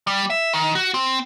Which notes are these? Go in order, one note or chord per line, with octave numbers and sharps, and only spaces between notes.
G3
E5
D#3
F#4
C4